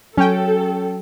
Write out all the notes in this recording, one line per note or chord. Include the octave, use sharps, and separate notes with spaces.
F#3 C#4 A4 G5